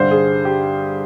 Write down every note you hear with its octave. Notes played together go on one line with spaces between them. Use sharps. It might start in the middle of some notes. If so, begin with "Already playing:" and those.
Already playing: G2 D3 G3 C5
G#4
G4